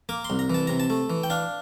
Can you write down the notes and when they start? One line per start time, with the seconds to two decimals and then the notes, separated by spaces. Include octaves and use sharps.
0.09 A#3 D6
0.24 C6
0.30 C2
0.39 A#5
0.50 E3 A5
0.67 C3 A#5
0.80 A5
0.90 A3
1.10 E3
1.23 G5
1.30 D4 F5